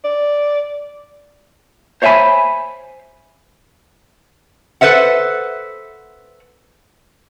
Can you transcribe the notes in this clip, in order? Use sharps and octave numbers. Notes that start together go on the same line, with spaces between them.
D5
C5 C#5 E5 F5 G#5 B5
A4 B4 C5 E5 F#5